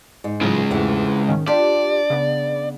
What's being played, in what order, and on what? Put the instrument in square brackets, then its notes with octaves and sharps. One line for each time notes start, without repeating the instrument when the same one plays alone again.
[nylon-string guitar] G#2
[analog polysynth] A2 F3 F#3 [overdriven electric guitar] C#3 G#3
[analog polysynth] E2 G#2 A3 [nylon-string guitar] C3 E3 B3
[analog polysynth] G#2 D#3 C#4
[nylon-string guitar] D4 [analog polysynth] F4 G4 [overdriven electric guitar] D5
[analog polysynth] C#3 B3